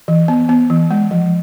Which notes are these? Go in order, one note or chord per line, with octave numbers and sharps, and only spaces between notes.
E3
B3
B3
E3
G#3
F3